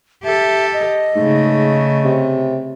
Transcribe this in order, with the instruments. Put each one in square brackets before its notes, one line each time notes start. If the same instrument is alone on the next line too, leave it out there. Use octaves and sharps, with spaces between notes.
[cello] G4 A4 [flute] E5
[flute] D#5
[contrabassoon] G#2 [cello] C#3 A3
[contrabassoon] C3